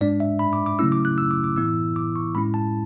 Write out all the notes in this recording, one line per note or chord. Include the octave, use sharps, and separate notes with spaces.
G#2 G#3 D4 D5
E5
B5
D6
D6
C#3 F#3 A3 C#4 E4 E6
D6
F#6
E6
D6
D6
A2 E3 B3 E4 E6
D6
C#6
A2 G#3 C#4 E4 B5
A5